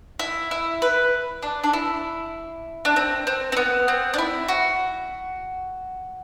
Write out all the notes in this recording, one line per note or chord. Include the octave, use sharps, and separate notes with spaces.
E4
E4
B4
D4
D4
E4
D4
C4
C4
C4
B3
C4
D4
E4
F#4